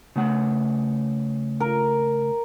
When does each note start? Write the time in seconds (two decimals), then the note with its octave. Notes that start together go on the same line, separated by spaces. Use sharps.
0.16 C#3 A3 F#5
1.60 A#4